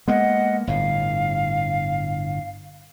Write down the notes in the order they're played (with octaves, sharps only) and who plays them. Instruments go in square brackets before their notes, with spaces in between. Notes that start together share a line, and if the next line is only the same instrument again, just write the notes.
[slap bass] G#3 A#3 B3 [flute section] D#5 F#5
[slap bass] G1 A2 [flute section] F5